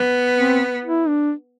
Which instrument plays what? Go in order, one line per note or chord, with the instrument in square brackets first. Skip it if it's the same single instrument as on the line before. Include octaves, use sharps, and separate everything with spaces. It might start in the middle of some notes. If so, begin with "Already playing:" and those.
Already playing: [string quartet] B3
[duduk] C4
E4
D4